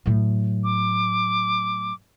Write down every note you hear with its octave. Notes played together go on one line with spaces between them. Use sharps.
A2 F#3
D6